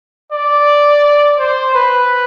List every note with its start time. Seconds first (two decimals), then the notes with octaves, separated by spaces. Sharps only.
0.32 D5
1.39 C5
1.75 B4